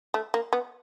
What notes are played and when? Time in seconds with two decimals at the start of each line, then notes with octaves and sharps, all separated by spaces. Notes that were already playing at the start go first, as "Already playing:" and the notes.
0.14 A3
0.34 A#3
0.53 B3